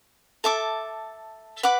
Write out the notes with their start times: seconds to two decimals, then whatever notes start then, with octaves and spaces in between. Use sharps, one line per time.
0.44 A4 E5 A5 D6
1.63 B4 F#5 B5 D6